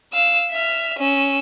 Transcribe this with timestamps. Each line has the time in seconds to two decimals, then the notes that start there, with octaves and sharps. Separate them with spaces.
0.13 F5 E6
0.51 E5 F6
0.99 C#4 E6